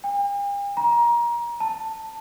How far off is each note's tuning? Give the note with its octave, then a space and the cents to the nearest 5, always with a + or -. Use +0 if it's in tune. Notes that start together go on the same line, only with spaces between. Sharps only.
G5 +45
A#5 +25
A5 +10